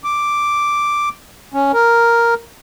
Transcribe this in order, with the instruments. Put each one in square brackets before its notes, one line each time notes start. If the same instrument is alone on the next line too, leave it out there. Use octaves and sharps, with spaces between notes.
[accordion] D6
C#4
A#4